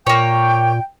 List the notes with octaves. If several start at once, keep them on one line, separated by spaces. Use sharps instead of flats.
A#2 A#3 C#5 G5